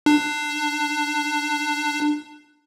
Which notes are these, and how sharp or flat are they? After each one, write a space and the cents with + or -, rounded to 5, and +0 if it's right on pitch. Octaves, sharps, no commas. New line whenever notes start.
D4 +20